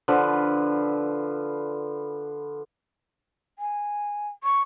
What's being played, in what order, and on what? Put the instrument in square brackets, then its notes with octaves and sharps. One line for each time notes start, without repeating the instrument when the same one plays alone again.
[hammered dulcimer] D3 F3 F4 B4
[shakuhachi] G#5
C#6